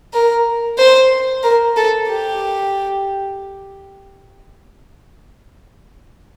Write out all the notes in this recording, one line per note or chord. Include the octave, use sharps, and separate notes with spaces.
A#4
C5
A#4
A4
G4